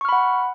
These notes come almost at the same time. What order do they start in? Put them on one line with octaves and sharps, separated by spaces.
C#6 F6 B5 F#5